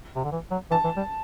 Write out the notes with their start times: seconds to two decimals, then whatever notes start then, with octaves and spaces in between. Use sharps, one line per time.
0.16 C3
0.24 D3
0.32 E3
0.51 F#3
0.71 E3 A5
0.84 E3
0.97 G3